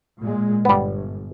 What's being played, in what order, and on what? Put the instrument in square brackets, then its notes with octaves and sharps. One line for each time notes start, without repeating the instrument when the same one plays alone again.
[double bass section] A#2 G#3
[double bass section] G1 [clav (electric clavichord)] G3 B3